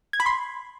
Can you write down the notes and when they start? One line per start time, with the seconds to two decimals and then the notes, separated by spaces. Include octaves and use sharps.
0.13 G#6
0.20 B5
0.26 C6